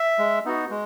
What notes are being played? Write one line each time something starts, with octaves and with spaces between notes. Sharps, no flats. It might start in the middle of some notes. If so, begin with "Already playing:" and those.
Already playing: E5
G#3
B3 D#4 F#4
G#3